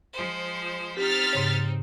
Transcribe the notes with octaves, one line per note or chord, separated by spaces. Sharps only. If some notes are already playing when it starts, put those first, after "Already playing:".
F3 G#3 C5
C4 D#4 G4 F6 A6 B6
G#2 C#3 C#5